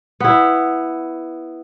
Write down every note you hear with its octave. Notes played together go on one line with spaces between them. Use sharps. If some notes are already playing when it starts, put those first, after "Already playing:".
B3 E4